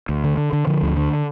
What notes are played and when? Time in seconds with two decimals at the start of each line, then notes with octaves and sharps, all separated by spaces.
0.09 D2
0.24 D3
0.37 D3
0.53 D3
0.67 D3 F3
0.82 D2
0.97 D3